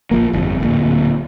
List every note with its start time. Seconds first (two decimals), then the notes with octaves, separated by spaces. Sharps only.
0.11 A#1 F3 A#3
0.33 G1 F2
0.60 D1 G1 A#2